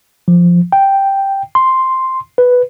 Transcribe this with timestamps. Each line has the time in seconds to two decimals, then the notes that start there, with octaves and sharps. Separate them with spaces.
0.28 F3
0.72 G5
1.55 C6
2.38 B4